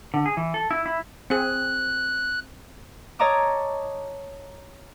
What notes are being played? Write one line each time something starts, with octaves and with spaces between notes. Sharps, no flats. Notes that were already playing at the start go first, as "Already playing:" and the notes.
D3
G#4
E3
A4
E4
E4
C4 G#4 F#6
C#5 D#5 A5 A#5 D6 E6